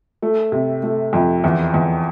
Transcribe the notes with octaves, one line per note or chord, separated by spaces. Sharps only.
A3
C3
A3
F2
E2
E2